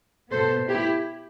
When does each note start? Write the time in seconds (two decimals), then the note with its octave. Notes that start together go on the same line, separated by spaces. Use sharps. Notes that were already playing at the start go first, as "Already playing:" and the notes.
0.30 B2 B3 A4 C5
0.68 E4 G4